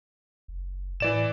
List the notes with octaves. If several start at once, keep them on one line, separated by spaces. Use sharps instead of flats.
F#1
A2 E3 D5 E7